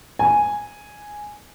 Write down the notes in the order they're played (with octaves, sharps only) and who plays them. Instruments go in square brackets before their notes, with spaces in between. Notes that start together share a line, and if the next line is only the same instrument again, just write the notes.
[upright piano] G#5